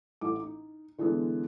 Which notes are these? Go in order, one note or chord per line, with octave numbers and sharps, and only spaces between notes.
A1 A2 D6
D#4
D3 E3 G#3 B3